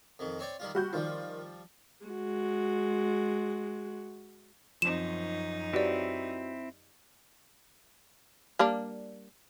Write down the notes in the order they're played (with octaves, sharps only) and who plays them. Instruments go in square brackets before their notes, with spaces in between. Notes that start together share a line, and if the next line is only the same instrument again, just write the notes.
[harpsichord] F2 D#3
C4 C#5 D5
D#3 G3 F4
[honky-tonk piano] G3 F#4 G6 [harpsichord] F#5
[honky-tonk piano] D#3 F4 [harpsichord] F3 G3
[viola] G#3 F#4
[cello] F#2 D#4 [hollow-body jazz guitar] F3 C4 [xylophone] E7
[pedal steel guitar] C4 E4 [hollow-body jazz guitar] F#4 B4 C#5 [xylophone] G4 D5
[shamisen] G3 A#3 D4